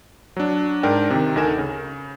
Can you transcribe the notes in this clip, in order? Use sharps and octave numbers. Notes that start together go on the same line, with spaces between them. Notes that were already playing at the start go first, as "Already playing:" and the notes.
F#3 D4
G#2 D4 A#4 D5 G5
C3 D#3
D2 D#4 A4 A#4 G#5 E7
C#3